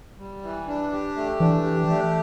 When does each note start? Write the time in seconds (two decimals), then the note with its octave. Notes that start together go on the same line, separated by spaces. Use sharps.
0.18 G3
0.43 E3
0.68 D4
0.92 G4
1.17 A3
1.40 E3 D4
1.64 G4
1.90 A3